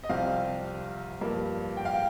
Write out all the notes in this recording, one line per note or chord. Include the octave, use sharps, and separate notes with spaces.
D#5
C2 C3 F3 C4 F5
G2 F3 A#3
G5
F5
G5